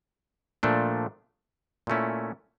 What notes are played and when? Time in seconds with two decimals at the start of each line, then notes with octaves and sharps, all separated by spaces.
0.63 A#2 F3 A3 D4
1.87 A#2 A3 C#4 E4